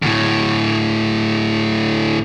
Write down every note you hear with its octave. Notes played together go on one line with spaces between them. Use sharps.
D2 A2